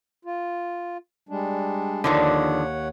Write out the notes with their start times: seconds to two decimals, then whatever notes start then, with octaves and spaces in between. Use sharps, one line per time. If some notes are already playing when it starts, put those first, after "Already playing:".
0.25 F4
1.29 G3 G#3 D4
2.04 D#2 D3 D#3 F3 C#5 F#5